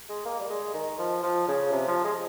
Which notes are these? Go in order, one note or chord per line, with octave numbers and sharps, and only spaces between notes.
G#3
A#3
G3
G#3
D#3
F3
F3
C#3
C3
F3
G#3